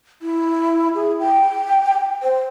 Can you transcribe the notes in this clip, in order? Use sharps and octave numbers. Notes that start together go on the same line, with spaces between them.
E4
G#4
G5
C5